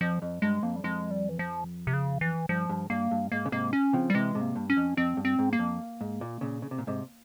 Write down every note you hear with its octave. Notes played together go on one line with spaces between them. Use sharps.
F2 F3
F2
G2 G#3
F2 A#3
G3
F2 G#3
G3
E3
F3
C3
C#3
E3
G2 F3
G2
G2 A#3
G2
G#2 A#3
C#3
G#2 C3 A#3
C#4
C#3 F3 C4
G3
C3 E3 G#3
G#2 C3
A#3
G2
C#4
F2
F2 C4
G2
C4
G#2
A#3
F2
G#2
A#2
A#2 C#3
C#3
C3
A#2
G#2 C3